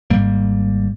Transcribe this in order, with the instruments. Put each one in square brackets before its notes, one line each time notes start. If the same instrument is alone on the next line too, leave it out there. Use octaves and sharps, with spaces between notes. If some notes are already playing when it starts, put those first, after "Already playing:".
[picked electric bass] G#1 G#2 G3 A#3